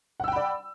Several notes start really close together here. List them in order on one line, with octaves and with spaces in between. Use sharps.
F#5 E6 G5 B5 D5